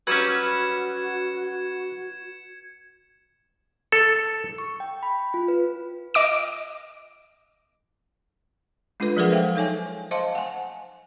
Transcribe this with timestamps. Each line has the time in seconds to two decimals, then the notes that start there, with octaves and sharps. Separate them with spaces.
0.07 F#3 G3 C#4 F#4 B4 G#6 C#7 E7
3.92 A4
4.58 C#6
4.80 G5
5.03 B5
5.34 F4
5.48 B4
6.14 D#5 D6 D7
9.00 G#3 D4 F4 A4 B4
9.17 F3 F#3 G#4 A#4 B4 F#5
9.30 A4 C5 E5 F5 G5
9.55 D#4 A4 C#5 G#5
10.11 C5 D#5 F5 A5 C6
10.35 F#5 G#5